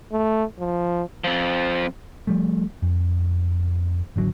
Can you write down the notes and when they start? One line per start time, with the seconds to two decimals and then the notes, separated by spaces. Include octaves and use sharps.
0.12 A3
0.59 F3
1.24 F2 F3
2.27 F3 G3 A3
2.82 F2
4.16 G#1 D3 F#3